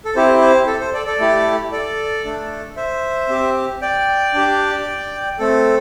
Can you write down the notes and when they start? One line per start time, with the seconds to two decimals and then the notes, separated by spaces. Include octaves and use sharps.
0.05 A4
0.15 C4 E4 G4 C5
0.41 C5
0.67 A4
0.80 C5
0.94 A4 D5
1.06 A4 D5
1.19 A3 E4 G4
1.72 A4 D5
2.25 A3 D4 A4
2.76 C5 E5
3.29 C4 G4
3.82 D5 G5
4.34 D4 G4
5.39 A3 C4 A4